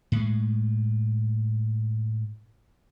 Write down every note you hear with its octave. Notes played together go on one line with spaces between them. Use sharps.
A2 G#3